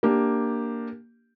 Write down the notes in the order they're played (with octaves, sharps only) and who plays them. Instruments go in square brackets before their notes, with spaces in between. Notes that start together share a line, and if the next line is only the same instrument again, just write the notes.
[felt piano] A#3 D4 G4